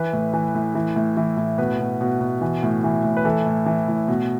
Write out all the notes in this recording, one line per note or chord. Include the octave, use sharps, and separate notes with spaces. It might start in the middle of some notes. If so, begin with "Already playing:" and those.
Already playing: E3 B4
A2
E3
A2
E3
A2
E3
A2
B2 B4
B2
B2
B2
E3
A2
E3
A2
B4
E3 A4
A2
E3
A2
B2